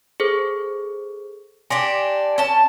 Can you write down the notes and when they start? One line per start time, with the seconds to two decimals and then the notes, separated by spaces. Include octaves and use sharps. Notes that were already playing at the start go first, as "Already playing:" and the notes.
0.20 G#4 A4 C5
1.70 D4 G4 G#5 C6 A#6
2.38 C#4 A5